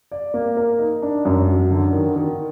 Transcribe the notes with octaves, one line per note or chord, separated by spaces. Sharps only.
D5
A#3
A#4
D#4
D4
F#2
F#3
D3
D#3
D#3